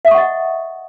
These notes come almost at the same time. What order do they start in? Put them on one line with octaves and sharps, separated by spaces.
E5 D#6 C#6 F#5 D#5